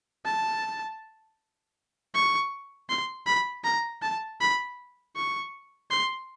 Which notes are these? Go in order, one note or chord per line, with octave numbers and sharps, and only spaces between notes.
A5
C#6
C6
B5
A#5
A5
B5
C#6
C6